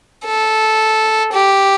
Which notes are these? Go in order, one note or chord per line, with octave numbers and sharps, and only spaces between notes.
A4
G4